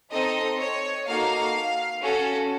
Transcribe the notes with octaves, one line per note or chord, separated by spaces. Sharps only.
C4 D#4 A4 D#5
C#5
A#3 D#4 F#4 A4 F5
C#4 F#4 A4